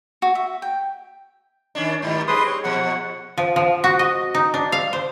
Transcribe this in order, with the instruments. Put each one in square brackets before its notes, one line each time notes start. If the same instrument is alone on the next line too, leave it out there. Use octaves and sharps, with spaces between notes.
[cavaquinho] F#4
E5
G5
[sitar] D#3 C#4 D4
G#2 D#3 G3
[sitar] G3 C4 G#4 [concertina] B4 C6 D#6
[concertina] C#5
[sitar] A#2 F3 [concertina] F#5
[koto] F3
F3
F#4
D#5
D#4
D4
F5
C5